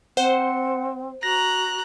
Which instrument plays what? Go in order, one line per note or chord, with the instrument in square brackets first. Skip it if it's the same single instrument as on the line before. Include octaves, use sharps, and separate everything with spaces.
[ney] C4 [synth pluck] C5 [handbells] F#5
[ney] F#4 [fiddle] A#5 F#6 [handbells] A#6